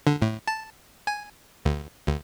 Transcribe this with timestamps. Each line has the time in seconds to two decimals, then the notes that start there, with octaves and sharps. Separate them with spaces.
0.07 D3
0.22 A2
0.48 A5
1.07 G#5
1.65 D2
2.07 D2